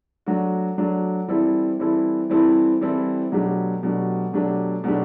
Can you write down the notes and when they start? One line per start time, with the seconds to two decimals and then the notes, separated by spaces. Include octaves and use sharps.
0.26 F#3 A3 D4 F#4
0.78 F#3 A3 D4 F#4
1.28 E3 G3 C4 E4 A4
1.80 E3 G3 C4 E4 A4
2.30 E3 G3 C4 E4 A4
2.81 E3 G3 C4 E4 A4
3.32 B2 F#3 A3 D4 G4
3.83 B2 F#3 A3 D4 G4
4.33 B2 F#3 A3 D4 G4
4.84 B2 F#3 A3 D4 G4